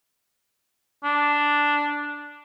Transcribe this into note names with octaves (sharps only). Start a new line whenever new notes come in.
D4